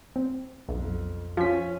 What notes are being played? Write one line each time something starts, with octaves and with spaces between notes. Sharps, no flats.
C4
B1 F2
F3 C#4 F4 B6